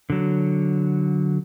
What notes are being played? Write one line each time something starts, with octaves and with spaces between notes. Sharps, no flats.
D3 F#3